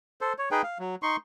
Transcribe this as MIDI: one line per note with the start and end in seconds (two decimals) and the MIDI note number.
0.21 0.33 69
0.21 0.33 72
0.38 0.49 73
0.51 0.62 63
0.51 0.62 68
0.51 0.62 71
0.51 0.62 79
0.63 0.78 77
0.79 0.95 54
1.02 1.16 63
1.02 1.16 84
1.02 1.16 85